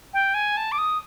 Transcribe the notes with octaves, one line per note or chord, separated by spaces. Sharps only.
G5
G#5
A5
D6
D#6